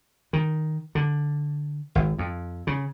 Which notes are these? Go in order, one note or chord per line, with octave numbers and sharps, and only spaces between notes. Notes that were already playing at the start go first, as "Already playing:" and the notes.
D#3
D3
G#1
F2
C#3